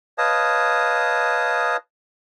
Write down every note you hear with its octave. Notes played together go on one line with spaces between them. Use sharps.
B4 C#5 D#5 F5 A5 D#6